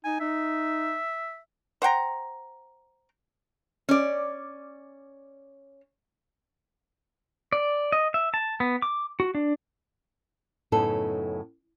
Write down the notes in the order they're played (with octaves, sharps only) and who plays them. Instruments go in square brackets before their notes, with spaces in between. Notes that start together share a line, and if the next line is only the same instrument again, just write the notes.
[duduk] D#4 [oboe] G#5
[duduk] D#4 [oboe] E5
[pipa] C5 F#5 G5 A#5
[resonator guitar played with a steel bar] C#4 D5
[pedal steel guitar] D5
D#5
E5
A5
B3
D6
F#4
D4
[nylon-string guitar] F#2 A2 C#3 B3 D#4 A4